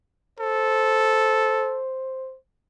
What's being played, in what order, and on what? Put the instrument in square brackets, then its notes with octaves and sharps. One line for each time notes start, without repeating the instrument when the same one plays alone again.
[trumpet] A4 [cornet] C5